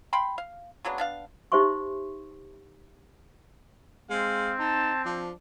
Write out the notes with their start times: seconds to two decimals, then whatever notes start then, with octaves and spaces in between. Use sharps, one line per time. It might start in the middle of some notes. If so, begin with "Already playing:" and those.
0.13 F5 G5 B5 C6
0.38 F5
0.85 C#3 F#3 B3 D4
0.98 B3 D4 F5
1.52 D#4 G4 C5 E5 C6 C#6
4.10 G#3 C4 F5
4.59 D#4 A5
5.05 F3 D4